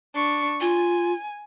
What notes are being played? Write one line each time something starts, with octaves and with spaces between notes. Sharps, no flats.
D4 C#6
F4 G#5